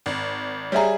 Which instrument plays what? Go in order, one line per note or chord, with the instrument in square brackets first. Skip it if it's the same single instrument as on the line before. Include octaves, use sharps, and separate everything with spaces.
[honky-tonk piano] G#1
[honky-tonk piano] G3 G#4 [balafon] C#5 E5 A#5